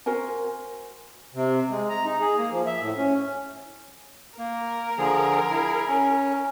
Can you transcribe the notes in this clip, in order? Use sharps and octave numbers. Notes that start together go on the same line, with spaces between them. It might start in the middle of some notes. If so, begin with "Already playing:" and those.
F#4 A#4 C5 G#5
C3
G#3
A#5
D#4
G#4
A#3
F3
E5
A2
C#4
A#3 A#4
D3 F3 G#4
E4 G#4
C#4